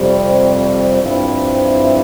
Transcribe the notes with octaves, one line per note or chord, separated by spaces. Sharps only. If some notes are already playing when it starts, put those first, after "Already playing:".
Already playing: F2 C3 G3
G2 F3 C4 E4